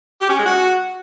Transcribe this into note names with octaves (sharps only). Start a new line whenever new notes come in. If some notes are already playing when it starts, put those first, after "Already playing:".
G4
C#4
G#3
F#4